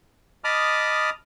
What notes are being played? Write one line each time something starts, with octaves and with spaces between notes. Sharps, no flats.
D#5 A5 B5 D6 D#6 F6